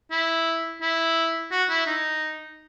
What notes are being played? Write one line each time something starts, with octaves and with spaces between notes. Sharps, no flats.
E4
E4
F#4
E4
D#4